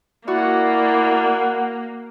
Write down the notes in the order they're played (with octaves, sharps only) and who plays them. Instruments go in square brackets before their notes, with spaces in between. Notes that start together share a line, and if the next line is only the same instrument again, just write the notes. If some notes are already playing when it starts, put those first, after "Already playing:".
[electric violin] A#3 [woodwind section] E4 D5 [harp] F#4 [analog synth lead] F#5